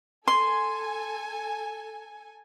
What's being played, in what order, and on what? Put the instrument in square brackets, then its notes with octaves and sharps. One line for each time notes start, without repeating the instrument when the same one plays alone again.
[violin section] A4 G#5 [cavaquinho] C6